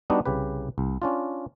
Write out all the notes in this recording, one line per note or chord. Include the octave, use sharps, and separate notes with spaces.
G3 B3 D4 D#4 F#4
C2 C#3 G4 B4
C2
C#4 D4 F4